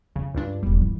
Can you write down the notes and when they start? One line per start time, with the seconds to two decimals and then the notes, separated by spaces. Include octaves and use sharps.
0.16 F2 C#3
0.35 C#2 G2 D4
0.63 E1 F2 G3
0.80 F2 E3